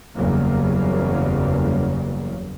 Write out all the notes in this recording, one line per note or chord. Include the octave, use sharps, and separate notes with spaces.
F#1 E2 C#3 F#3 G3 A#3